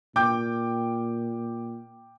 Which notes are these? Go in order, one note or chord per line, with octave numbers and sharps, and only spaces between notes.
A#2 G5 D6 G6